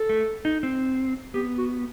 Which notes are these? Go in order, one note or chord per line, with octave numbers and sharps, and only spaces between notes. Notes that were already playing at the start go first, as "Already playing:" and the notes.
Already playing: A4
A3
D#4
C4
B3 G4
F#4